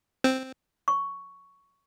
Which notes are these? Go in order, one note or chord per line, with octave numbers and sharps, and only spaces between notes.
C4
C#6